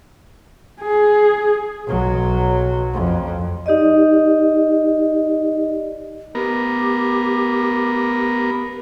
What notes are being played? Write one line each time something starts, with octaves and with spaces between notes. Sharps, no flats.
G#4
B1 F#3
F2
D#4 G4 D5 D#5
B3 G4 A#4